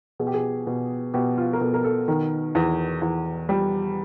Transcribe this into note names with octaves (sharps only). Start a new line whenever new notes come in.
B2 G#4
G4
G#4
B2
B2 G4
F4
A#4
B2 A4
A#4
A4
D#3 A#4
E2
E2
G3